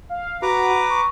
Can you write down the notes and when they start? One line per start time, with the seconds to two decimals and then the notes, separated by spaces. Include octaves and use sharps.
0.09 F5
0.42 F#4 B4 A#5 D6
0.90 C#6